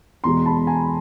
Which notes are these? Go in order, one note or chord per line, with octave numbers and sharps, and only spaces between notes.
E2 B2 G#3 A#5 C6
A5 B5
G#5 A#5